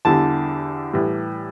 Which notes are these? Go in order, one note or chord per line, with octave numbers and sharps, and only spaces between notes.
E2 D3 G3 A5
A2 E3 G3